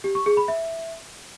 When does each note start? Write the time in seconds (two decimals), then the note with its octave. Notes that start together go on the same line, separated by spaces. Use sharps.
0.04 G4
0.15 C#6
0.26 G#4
0.37 B5
0.48 E5